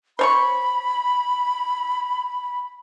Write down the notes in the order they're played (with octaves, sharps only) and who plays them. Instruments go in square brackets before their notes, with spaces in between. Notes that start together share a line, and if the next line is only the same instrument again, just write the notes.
[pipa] C5 C#5 C#6 [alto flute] B5